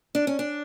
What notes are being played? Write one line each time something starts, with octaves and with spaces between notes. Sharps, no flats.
D4
C#4
D4